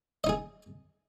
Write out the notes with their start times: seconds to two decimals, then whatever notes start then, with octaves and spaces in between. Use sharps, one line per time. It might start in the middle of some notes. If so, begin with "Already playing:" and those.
0.24 D#5
0.27 D#4
0.29 G#4